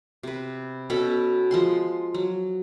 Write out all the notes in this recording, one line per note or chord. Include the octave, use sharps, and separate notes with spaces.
C3 B4
B2 C#4 A4 B5
F3 G#3 C6
F#3